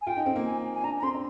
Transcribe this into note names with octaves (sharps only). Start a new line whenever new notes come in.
G#5
F4 G5
D#4
C4
A#3
G#5
G#5
D4 A#5
A#5
C4 C6
D4